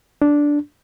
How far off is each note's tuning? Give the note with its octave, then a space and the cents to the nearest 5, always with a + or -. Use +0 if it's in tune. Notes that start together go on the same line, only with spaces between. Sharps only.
D4 -5